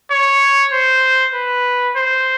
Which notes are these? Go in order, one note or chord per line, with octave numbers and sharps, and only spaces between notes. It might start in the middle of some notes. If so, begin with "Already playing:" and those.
C#5
C5
B4
C5